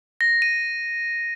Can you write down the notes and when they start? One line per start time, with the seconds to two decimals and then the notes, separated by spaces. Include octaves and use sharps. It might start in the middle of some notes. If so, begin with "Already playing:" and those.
0.21 A#6
0.42 D#7